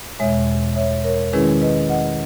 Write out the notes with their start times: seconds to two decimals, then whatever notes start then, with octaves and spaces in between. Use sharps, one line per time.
0.19 E2 B2 G#3 C#5 E5
0.76 C#5 E5
1.04 A#4 C#5
1.33 D#3 G#3 C#4 E4 G#4 B4
1.62 B4 D#5
1.89 D#5 F#5